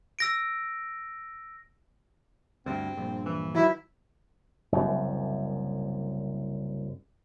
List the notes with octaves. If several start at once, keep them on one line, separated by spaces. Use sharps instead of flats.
E6 A#6 D7
D2 G2 C4
A#1 G2
E3
D#3 F#3 E4
F#1 C2 F#2